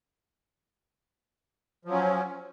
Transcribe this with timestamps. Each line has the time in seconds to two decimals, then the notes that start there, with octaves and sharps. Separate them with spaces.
1.85 F3
1.89 F#3
1.92 C#4